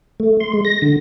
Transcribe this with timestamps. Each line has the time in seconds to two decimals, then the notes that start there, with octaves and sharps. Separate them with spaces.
0.20 A3
0.40 C6
0.53 G#3
0.65 A#6
0.82 D3